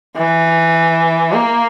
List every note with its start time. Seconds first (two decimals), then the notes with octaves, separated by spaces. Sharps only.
0.16 E3
1.33 A#3